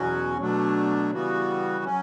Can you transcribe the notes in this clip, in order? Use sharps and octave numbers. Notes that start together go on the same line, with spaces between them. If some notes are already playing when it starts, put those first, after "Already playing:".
Already playing: E2 B2 F#3 C#4 F#4
B2 F#3 A3 D4
C#3 E3 G3 B3 F#4
F#3 C#4